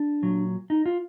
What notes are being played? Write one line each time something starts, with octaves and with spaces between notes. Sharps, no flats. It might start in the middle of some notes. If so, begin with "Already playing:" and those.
Already playing: D4
A#2 F#3
D#4
F4